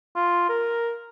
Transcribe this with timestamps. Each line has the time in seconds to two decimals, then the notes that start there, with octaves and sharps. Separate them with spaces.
0.16 F4
0.49 A#4